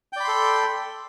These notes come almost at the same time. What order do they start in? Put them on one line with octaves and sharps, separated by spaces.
G5 D5 B5 C6 A4